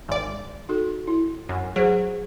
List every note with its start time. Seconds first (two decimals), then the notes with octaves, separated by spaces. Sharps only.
0.08 G#1 D5
0.69 D#4 F#4 A4
1.07 E4
1.49 F#2
1.76 F#3 G#4 C5